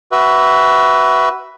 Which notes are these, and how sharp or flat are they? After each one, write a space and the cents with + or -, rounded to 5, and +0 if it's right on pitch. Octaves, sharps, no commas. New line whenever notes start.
F#4 +25 B4 +0 E5 +0